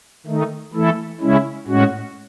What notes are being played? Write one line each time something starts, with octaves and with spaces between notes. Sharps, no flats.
D#3 A3 D#4
E3 A3 E4 A4
C#3 G#3 C#4 E4
A2 G#3 C#4 F#4